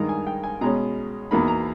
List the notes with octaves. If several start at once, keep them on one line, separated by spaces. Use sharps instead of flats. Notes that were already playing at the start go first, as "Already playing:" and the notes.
Already playing: G2 D#3 G#3 D#4 A#5
G#5
G5
G#5
B2 G#3 C#4 A#5
E2 B2 A#3 D#4 B5
A#5